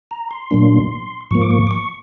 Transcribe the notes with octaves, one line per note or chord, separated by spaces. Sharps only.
A#5
C6
A#2 F#3 A#3 D4
G#2 F3 A#3 C#6
D6
C#6
D6
C#6